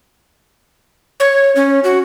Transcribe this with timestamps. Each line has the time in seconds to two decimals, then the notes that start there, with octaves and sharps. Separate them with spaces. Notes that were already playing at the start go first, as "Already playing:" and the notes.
1.20 C#5
1.56 C#4
1.84 F#4